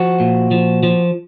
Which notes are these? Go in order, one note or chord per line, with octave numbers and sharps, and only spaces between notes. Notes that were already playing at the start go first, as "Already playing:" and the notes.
Already playing: F3 F#4
A#2
F3
F3